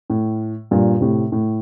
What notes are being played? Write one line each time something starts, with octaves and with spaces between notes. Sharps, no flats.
A2
G2 A#2
A2 C3
A2